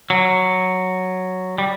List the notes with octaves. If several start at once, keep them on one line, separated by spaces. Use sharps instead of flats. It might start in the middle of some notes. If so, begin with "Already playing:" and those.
F#3
G3